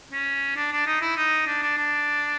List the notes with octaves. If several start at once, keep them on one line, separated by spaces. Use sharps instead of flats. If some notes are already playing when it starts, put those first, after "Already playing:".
C#4
D4
D4
D#4
E4
D#4
D4
D4
D4